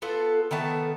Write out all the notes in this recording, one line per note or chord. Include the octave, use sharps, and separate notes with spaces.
B3 F4 A4
D#3 A3 B3 A5